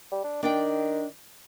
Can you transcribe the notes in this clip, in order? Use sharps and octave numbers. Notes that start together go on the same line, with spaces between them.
G3
D4
D#3 D4 D5 G5